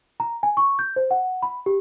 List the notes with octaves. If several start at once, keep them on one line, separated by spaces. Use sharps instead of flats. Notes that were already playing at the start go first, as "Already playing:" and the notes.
A#5
G#5
C#6
G6
C5
F#5
B5
G4